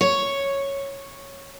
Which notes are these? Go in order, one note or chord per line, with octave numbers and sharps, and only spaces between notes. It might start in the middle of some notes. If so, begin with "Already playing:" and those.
C#5